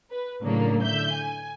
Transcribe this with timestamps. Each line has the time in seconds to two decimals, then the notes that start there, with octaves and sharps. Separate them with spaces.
0.11 B4
0.42 A2 C#3 F#3 A#3 D4
0.83 D3 E5 G6
1.13 G#5